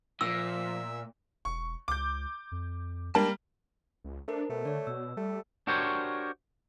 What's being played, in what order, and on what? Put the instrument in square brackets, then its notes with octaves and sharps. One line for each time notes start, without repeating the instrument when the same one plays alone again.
[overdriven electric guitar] A#2 [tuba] F3 [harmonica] E5 [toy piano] E6
[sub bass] E1 [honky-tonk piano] C#6
[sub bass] C#2 [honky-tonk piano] D6 G6
[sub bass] F2
[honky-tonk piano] G3 A#3 A#4 [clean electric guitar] G#3 D4 A5
[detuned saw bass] C#2
[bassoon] A3 [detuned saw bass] D4 [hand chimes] A4 A#4 C5
[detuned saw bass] B2 [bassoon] A3
[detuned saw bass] D3 [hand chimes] C#5 D5
[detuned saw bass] B2 [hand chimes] E6
[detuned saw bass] G3 [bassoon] A3
[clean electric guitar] D4 F#4 G4 A#4 C5 C#5